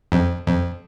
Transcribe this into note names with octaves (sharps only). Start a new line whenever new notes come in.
F2
F2